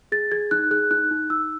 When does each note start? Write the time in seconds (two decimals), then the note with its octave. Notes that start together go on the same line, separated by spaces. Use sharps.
0.12 G#4 A6
0.31 G#4 G#6
0.51 D#4 F#6
0.71 G#4 F#6
0.91 D#4 F#6
1.11 D#4
1.30 D#4 E6